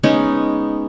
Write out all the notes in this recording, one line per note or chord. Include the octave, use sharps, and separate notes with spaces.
G#3 B3 C#4 D#4